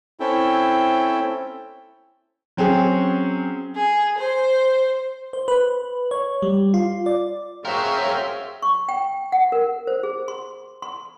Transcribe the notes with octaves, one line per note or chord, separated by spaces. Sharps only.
C4 C#4 E4 A4 E5 G5
F#3 C4 C#4 G#4
G#4
C5
C5
B4
C#5
G3
F4
D5
F#4 G#4 A#4 C5 C#5 E5 F5 G5
C#6
G5
F#5
A#4
C5
G#4
C6
C6